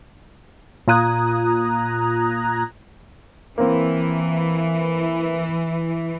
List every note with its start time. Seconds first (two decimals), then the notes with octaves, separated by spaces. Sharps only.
0.88 A#2 F4 A#5 D#6 F#6 G#6
3.58 E3 A#3 C4